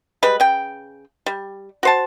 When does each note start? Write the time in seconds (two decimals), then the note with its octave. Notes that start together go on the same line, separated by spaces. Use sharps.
0.23 G3 G#3 B4
0.40 C#3 G5
1.26 G3
1.83 F#4 C5 A5